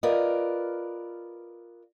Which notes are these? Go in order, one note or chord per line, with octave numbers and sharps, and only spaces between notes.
F4 A#4 B4 D5 D#5